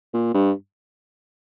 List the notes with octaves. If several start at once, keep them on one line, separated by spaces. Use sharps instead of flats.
A#2
G2